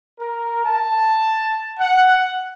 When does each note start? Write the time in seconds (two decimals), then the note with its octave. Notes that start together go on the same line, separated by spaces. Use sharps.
0.20 A#4
0.64 A5
1.79 F#5